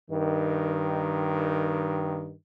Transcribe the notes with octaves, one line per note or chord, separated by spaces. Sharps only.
G2 D#3